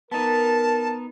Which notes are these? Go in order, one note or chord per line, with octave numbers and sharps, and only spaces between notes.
B3 D#4 A#4 A5